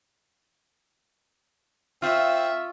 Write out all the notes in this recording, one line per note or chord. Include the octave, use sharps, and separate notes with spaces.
C4 F4 E5 F5 C#6 F6